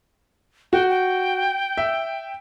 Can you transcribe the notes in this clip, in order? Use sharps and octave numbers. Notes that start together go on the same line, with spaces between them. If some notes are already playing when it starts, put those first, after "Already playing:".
F#4 G5
G5
E5